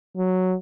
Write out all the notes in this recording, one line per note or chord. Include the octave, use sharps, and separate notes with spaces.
F#3